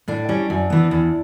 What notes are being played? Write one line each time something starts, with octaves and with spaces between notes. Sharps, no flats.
A2 D4
G3 C#4
F#2
E3 B3
E2